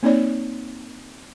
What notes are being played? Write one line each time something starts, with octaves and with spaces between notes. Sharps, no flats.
A#3 C4 D#4 C#5 D5